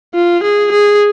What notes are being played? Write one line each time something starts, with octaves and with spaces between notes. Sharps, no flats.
F4
G#4
G#4